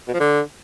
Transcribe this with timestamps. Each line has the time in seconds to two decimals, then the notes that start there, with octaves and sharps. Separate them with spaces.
0.08 B2
0.14 F3
0.20 D3